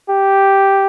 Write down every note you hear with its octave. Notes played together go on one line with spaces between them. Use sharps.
G4